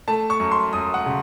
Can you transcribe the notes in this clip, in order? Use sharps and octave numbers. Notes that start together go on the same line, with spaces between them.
A3 A5
C#6
F#2
C6
F#2 D#6
F#5
C#3